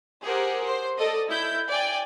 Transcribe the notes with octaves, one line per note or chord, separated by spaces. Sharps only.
G4 G#4 A#4 C5 F#5
C5
A4 D5 D#5
E4 G6
D5 G5 G#5